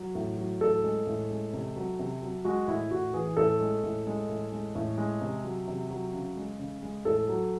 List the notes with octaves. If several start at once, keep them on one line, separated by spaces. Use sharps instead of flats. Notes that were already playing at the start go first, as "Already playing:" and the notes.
Already playing: F#3
A2
F#3
A2 A4
G#3
A2
G#3
C3
F#3
C3
F#3
G#3 F#4
A2 E4
A2 F#4
E3 G#4
A2 A4
G#3
A2
G#3
A2
G#3
A2
G#3
C3
F#3
C3
F#3
C#3
G#3
C#3
G#3
A2 A4
F#3